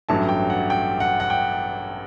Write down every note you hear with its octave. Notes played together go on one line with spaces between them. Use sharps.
A1 G2 F#3 A3 A5
G5
F#5
G5
F#5
F#5
G5